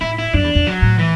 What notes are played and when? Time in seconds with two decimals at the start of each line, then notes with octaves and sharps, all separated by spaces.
0.01 A2 E4
0.19 E4
0.33 F#2 D4
0.44 E2
0.55 E2
0.67 F#3
0.82 A2
0.99 E3